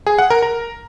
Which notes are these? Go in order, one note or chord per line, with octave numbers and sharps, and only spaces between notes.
G#4
F#5
A#4
A#4